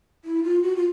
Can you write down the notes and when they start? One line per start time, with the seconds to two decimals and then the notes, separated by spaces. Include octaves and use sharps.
0.25 E4
0.44 F4
0.63 F#4
0.76 F4